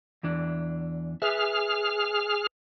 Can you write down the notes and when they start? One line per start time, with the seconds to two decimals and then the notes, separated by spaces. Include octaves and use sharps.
0.23 E2 E3 D4
1.22 G#4 B4 E5 F6